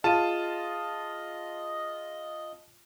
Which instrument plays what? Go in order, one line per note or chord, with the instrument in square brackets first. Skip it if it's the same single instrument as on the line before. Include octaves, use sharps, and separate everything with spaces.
[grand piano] F4 [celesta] G#4 D#7 [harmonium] D#5 [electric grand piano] A5